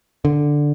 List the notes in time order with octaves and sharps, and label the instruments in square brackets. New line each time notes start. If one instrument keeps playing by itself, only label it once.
[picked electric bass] D3